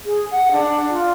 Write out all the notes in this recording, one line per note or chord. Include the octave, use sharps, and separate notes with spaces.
G#4
F#5
D4
F4